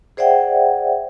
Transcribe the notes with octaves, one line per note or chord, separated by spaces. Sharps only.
G#4 C5 D5 E5 F#5 G5